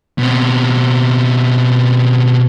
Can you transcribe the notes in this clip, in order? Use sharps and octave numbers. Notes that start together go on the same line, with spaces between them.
B2 C4